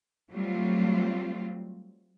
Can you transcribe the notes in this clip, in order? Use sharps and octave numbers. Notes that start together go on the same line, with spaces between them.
F#3 G3 A3 C4 F4